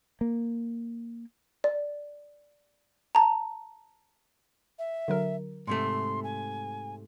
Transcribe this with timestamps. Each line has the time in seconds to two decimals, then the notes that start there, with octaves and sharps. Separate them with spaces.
0.21 A#3
1.64 D5
3.15 A5 A#5
4.79 E5
5.08 D3 F#3 A#4
5.67 G#2 C3 A3 C6
6.24 G#5